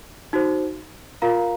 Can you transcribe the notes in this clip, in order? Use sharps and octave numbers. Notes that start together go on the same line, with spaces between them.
D#4 F#4 C5
F4 A#4 F5 A#5